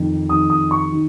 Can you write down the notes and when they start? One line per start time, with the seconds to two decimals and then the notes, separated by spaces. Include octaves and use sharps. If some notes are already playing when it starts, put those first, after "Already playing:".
Already playing: F2 D#3
0.29 F2 D#3 D#6
0.50 D#6
0.71 C#6
0.92 D#3